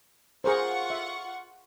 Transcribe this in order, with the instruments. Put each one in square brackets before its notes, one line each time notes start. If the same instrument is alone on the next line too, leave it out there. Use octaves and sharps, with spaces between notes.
[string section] F4 F#5 C#6 [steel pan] G#4 A#4 C5
[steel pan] E5